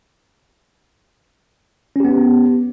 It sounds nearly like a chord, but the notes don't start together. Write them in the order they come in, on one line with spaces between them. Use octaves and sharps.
C#4 G4 B3